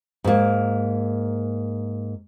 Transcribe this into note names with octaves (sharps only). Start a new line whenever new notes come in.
G#2 A#3